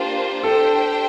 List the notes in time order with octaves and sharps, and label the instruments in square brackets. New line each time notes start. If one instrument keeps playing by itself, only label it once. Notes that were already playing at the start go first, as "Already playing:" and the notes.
Already playing: [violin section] A#3 D4 F4 C5 [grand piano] G4
[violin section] D4 G4 C5 G5 [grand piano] A4